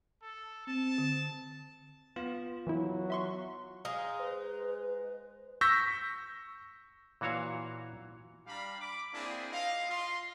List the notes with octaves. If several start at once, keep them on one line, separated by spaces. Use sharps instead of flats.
A4
C4 A5
D3
B3 F4
E3 F#3 E4
E5 C6 C#6
G#3 D#4 F5 D#6 F6
B4 C5
C#6 E6 G6 A#6 B6
A#2 E3 F#4 C#5 F5
G3 D4 F5 A#5 B5
B5 D6
A#3 C4 D4 E4 G#4
F4 D#5 F5
F4 C6